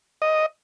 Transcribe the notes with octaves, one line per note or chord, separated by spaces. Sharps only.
D#5